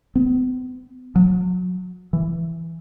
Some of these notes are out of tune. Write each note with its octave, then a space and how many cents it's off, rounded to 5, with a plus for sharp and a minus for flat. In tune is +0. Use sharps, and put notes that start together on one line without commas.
B3 +45
F#3 -30
E3 +10